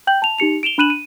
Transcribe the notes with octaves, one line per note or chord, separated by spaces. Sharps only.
G5 G6 F#7
A5 F7
D#4 G4 C#7 F7
D7 E7 F7 G7
D4 B5 F#6 D#7 E7 F#7
D#7